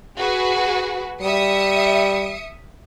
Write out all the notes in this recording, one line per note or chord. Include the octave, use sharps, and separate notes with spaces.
F#4 G#4 B4
G3 E5 D#6 C#7